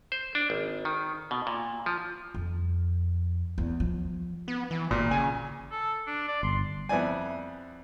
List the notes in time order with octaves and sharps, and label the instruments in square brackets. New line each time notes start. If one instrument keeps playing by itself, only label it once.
[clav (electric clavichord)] C5
D4
G#1
D#3
B2
A#2
F3
[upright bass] F2
E2
F3
[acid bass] B3
E3
[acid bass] G#1 [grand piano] A#2
[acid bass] C#3 [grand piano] G#5
[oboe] A4
D4
D5
[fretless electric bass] G1 [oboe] C6
[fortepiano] F2 B3 E4 D5 G#5